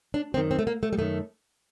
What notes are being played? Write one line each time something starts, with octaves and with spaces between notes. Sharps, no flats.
D4
F#2 D#3 C4
C4
A3
A#3
A3
G3
F#2 D#3 A3